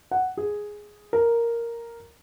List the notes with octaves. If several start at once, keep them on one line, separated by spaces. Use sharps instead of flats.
F#5
G#4
A#4